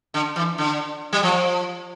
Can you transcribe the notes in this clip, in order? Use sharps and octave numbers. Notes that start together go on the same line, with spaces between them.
D3
E3
D3
G3
F3